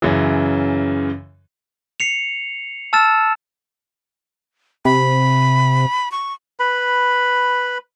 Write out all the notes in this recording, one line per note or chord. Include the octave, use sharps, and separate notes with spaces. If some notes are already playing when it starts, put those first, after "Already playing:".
F#2 C#3 E3
C7 C#7 F7
A5 E6 F6 A6 E7
C3 B5
C#6
B4 B5